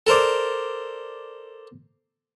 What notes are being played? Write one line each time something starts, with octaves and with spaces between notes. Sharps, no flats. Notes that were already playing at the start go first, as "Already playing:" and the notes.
A4 A#4 C5 D5